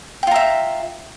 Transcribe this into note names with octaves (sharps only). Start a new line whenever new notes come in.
F4 E5 G5 A#5